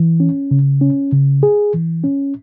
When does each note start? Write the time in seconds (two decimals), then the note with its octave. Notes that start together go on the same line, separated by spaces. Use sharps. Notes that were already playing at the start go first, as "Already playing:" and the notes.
Already playing: E3
0.20 C#4
0.51 C#3
0.81 C#4
1.12 C#3
1.43 G#4
1.74 E3
2.04 C#4